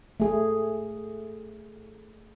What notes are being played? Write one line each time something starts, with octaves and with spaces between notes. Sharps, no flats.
A3 G#4